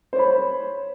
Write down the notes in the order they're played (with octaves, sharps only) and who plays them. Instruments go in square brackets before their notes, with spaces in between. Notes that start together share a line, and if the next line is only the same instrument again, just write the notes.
[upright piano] C5
C#5
B5